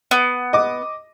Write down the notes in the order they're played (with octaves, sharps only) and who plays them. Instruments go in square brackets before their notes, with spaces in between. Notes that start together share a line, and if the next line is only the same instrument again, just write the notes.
[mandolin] B3
[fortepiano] D#5 D6